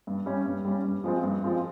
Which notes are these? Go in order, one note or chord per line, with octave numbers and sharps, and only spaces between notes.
G2
G3 C#4
G2
G3 C#4
G2
F3 G#3 C4 F4
G2
F3 G#3 C4 F4